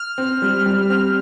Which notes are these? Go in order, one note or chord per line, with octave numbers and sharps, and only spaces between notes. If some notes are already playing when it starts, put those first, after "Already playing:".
Already playing: F6
C4
G3
G3
C4 F6